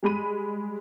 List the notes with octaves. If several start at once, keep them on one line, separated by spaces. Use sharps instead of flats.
G3 G#3 B5 D#7